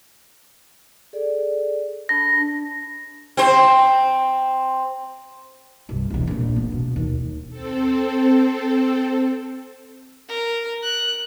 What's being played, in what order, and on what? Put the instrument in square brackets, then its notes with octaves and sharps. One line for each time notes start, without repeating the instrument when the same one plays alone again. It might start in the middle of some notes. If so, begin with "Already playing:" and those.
[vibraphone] G#4 A4 D5
[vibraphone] D4 A5 B5 [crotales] A#6
[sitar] C4 C5
[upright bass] C2 G2
E1 E2
A#1 D4
B3
B2
D#2
[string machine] C4 A4
[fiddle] A#4
F#6